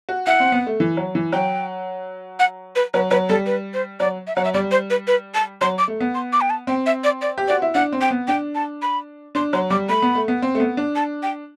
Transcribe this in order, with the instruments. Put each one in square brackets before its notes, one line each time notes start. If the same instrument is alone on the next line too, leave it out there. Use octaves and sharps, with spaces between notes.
[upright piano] F#4
[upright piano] E4 [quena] F#5
[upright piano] C4
B3
A3
E3
F#3
E3
[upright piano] F#3 [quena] G5
[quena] F#5
B4
[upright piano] F#3 [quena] B4
[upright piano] F#3 [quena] B4
[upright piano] G3 [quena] A4
[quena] B4
C5
[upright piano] F#3 [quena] D5
[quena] E5
[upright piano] F#3 [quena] F#5
[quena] E5
[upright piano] G3 [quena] D5
[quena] C5
B4
B4
A5
[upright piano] F#3 [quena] C6
[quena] D6
[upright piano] A3
B3
[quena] C6
D6
G5
A5
[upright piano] C4 [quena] G5
[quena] E5
D5
D5
[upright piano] G4
[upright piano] F#4 [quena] D5
[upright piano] E4
[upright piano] D4 [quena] F#5
[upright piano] C4
[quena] G5
[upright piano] B3
[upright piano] D4 [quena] G5
[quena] A5
B5
[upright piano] D4 [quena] C6
[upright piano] F#3 [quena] C6
[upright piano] G3 [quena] D6
[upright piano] A3 [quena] B5
[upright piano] B3
A3
B3
C4
A3
B3
D4
[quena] A5
G5